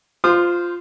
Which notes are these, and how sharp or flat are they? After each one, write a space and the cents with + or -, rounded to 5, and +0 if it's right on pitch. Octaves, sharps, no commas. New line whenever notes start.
F4 +0 C5 -15 D#6 -45